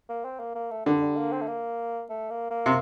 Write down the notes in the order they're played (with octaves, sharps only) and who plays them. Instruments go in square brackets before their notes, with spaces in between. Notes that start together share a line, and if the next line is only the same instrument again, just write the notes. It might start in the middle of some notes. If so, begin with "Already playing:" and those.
[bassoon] A#3
C4
A#3
A#3
A3
[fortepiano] D3 [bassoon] G3
[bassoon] G3
A#3
C4
A3
A#3
A3
A#3
A#3
[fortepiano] C3